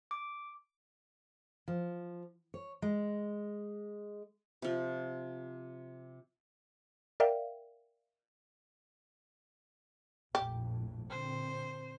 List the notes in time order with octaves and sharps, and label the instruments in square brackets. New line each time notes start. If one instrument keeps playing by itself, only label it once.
[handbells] D6
[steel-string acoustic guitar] F3
C#5
G#3
[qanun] C3 F3
[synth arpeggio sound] A#4 D5 E5 F5 G5
[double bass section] A#1 F2 A2 [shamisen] G4
[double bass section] A#2 D3 C4 [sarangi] C5